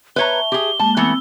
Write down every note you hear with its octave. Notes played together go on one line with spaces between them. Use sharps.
B4 C#5 E5 A5 A#5 C#6 G7
G4 G#4
G#3 A#3 A5
E3 A3 B3 C4 E6